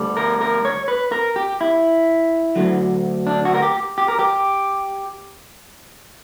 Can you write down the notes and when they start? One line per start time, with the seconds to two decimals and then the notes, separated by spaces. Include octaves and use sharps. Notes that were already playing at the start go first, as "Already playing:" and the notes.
Already playing: D2 D3 G3
0.17 A#4
0.41 A#4
0.65 C#5
0.88 B4
1.12 A#4
1.36 G4
1.61 E4
2.56 D2 D3 F#3
3.27 D4
3.45 F#4
3.55 A#4
3.62 G4
3.98 G4
4.08 A#4
4.19 G4